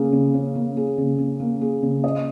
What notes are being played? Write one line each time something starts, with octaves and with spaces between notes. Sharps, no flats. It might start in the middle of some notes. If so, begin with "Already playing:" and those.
Already playing: C#3 A#3 C#4 G#4
C#3
C#4
A#3
G#4
C#3
C#4
A#3
G#4
C#3
D#5